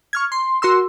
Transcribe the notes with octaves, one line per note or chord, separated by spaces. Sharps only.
C#6 F6 G#6
C6
F#4 A#4 C6 E6